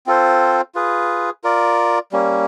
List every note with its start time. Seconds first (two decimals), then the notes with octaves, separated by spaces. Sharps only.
0.06 C4 F4 A4 C5
0.75 F4 G#4 B4
1.44 F4 A#4 D5
2.12 G3 A#3 C#4